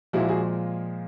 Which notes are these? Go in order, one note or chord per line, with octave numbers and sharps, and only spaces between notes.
A#2 F3 G#3 E4 F#4
F#4 G#4